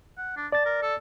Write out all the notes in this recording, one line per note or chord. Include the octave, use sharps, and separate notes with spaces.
F#5
D4
D5 A5 A6
A#4
A4